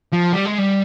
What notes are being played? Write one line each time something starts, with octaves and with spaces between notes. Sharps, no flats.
F3
G3
G#3
G3